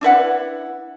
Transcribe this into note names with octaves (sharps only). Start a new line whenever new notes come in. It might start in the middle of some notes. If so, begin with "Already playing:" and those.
D4 E4 B4 F#5